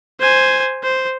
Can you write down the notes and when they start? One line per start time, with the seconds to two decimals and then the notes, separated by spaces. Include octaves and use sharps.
0.21 C5 G#5
0.83 C5